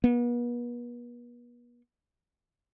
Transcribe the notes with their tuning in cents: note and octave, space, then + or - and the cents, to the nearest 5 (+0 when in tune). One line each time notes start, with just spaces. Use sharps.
B3 -40